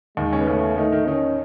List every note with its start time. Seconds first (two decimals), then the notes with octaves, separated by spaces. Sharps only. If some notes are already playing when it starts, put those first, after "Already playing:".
0.17 D#2 D#3 G#3
0.33 C#3 C#4
0.41 B3
0.47 C#3 A3 C#4
0.78 D#3 A3 D#4
0.92 D#3 D#4
1.08 D#3 C#4 D#4